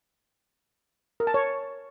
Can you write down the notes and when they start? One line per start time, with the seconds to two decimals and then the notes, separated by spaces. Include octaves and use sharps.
1.20 A#4
1.27 A5
1.34 C#5